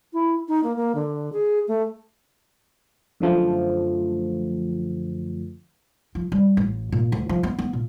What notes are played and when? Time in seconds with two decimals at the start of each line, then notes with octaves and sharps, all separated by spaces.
0.13 E4
0.48 D#4
0.64 A#3
0.76 A#3
0.95 D3
1.33 G#4
1.68 A3
3.20 F#2 D3 F3 A3
6.15 F3
6.32 G3
6.57 A1
6.92 A#2
7.12 D2
7.29 F3
7.43 B3
7.59 B3
7.73 A#2